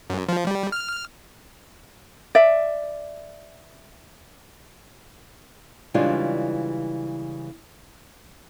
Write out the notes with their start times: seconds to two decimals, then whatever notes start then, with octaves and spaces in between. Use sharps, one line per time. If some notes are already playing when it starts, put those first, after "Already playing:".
0.10 F#2
0.29 F3
0.47 G3
0.72 F6
2.35 D5 E5
5.94 C#3 E3 G3 G#3 D4 F4